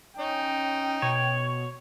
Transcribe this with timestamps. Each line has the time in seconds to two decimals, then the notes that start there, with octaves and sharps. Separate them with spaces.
0.19 C#4 D#4 G5
1.02 B2 C#5